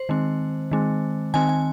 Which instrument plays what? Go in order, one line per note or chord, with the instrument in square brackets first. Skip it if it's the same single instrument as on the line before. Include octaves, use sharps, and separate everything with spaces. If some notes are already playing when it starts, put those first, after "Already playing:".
Already playing: [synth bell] C5
D#3 G#3 C4
D#3 G#3 C4
D#3 C4 G#5
G#5